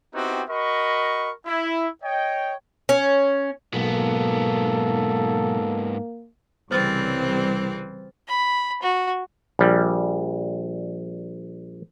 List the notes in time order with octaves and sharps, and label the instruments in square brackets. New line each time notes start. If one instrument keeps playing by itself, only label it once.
[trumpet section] B3 C4 D#4 E4 F#4 G4
F#4 A#4 D#5 B5 C#6
E4
C#5 D#5 G5
[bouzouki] C#4
[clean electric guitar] B1 [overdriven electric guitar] G#2 B3 [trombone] A#3 [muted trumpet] A4
[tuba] C2 [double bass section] C#3 G3 [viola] E3 C4 [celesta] C5 F6 A6
[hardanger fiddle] B5
F#4
[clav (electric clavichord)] A#1 G3